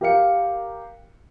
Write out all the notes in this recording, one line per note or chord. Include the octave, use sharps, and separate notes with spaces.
G4 A#4 F5 C#7